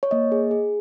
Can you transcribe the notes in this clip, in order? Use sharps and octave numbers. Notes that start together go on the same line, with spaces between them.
C#5
A#3 D#5
G#4
G#4